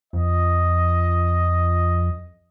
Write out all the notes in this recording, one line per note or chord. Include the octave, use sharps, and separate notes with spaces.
F2 D#5